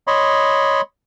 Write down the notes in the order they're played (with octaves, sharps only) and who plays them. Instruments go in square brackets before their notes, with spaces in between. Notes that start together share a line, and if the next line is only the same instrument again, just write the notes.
[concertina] C#5 D#5 B5 C6